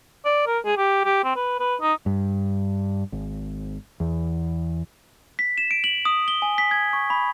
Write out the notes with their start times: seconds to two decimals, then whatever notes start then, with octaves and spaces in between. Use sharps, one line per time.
0.25 D5
0.46 A#4
0.65 G#4
0.77 G4
1.04 G4
1.24 C4
1.36 B4
1.59 B4
1.81 D#4
2.06 G2
3.12 G#1
4.00 E2
5.39 B6
5.58 E7
5.71 D7
5.84 F#7
6.05 D#6
6.28 G7
6.42 G#5
6.58 B6
6.71 G#6
6.93 C#6
7.10 B5